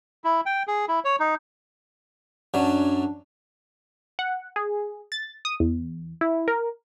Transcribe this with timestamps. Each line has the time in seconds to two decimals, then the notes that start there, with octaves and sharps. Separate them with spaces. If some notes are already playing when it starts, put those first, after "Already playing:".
0.24 E4
0.46 G5
0.67 G#4
0.88 E4
1.04 C#5
1.20 D#4
2.54 F#2 F#3 D4
4.19 F#5
4.56 G#4
5.12 A6
5.45 D#6
5.60 E2
6.21 E4
6.48 A#4